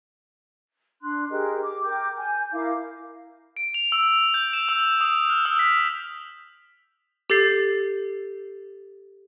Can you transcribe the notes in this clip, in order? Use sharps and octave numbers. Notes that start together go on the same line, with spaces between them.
D4 C6 F#6
G4 G#4 A#4 D#5
D6
A#4 G5 D6 G6
G#5 G6
E4 A#4 F5 D6
D7
F7
E6
G6
E7
E6
D#6
F6
E6
B6
G4 A4 G6 A6 C7